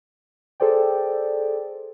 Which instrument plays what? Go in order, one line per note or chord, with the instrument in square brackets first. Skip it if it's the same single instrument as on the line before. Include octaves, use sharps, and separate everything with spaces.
[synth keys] G#4 A4 C5 D5 G5